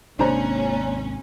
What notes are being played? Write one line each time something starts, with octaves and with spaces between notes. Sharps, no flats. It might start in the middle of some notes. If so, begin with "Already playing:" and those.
G#1 D#2 G#2 C3 C#4 D4 C5 A#5